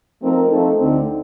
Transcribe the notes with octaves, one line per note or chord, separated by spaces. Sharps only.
F3 A3 C4 D#4 A#4
F3 A3 C4 D#4 A4
D2 D3 A3 C4 D#4